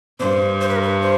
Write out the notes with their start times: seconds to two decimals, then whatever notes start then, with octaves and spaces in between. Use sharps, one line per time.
0.20 G2 C5
0.61 C5
0.69 B4
0.76 A#4
0.83 B4
1.02 C5